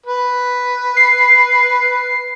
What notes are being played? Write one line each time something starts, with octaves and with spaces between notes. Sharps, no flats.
B4
C7